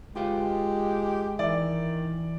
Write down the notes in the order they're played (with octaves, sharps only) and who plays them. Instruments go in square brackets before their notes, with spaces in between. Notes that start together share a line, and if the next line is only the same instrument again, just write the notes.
[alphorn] G#3 [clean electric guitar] F4 B4 F5 [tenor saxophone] G4
[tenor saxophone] D#3 [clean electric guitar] E3 E4 E5 [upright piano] D5